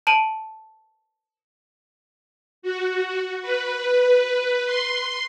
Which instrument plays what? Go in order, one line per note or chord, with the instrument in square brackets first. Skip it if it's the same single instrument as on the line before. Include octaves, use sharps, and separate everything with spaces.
[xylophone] A5 D7 D#7 F#7
[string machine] F#4
B4
C6